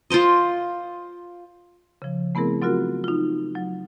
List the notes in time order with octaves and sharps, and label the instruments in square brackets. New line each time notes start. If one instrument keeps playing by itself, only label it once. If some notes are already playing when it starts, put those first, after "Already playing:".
[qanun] F4 A#4 C5 D#5
[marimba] C#3 F3
A3 B3 C4 E4 G#4 A#4
F#3 C4 F4 F#4 A#4
D#4 F4
F#3